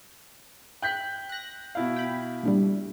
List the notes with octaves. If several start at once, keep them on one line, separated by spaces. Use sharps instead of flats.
G5 F#6 G6 B6
F#6 A#6
B2 E4 F5
G5 B5
A#2 D3 G3